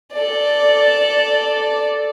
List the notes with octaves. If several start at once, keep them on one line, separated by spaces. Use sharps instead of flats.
A4 D5